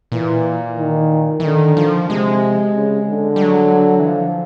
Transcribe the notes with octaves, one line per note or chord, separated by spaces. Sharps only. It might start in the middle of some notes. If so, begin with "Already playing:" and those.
A#2 E3
D#3
E3
D3 D#3
F3
C3 G#3
C#3
D3
G3
F#3
E3
F3